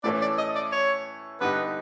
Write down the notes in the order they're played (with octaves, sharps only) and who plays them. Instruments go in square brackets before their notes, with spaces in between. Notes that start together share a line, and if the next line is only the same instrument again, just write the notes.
[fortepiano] A2 E3 A3 C#4 [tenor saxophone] D5
[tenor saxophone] D5
D#5
D5
C#5
[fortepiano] D3 G3 B3 D#4 [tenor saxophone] B4